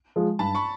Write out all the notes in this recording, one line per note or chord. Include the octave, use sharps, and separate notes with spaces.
F3 G#3
G2 A5 B5
B5 C#6